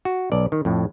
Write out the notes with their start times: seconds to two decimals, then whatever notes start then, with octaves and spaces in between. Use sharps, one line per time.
0.05 F#4
0.32 B1 D5
0.52 D#3
0.65 F2 A2